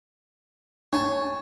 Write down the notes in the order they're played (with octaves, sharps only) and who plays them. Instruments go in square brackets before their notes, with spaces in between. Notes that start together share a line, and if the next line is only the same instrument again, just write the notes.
[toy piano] D4 [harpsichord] C#5 G#5 A5